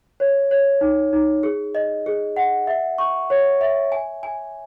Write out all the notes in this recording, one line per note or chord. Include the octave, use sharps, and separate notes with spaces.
C#5
C#5
D#4
D#4
G#4
D#5
G#4
F#5
E5
C#6
C#5
E5
G#5
G#5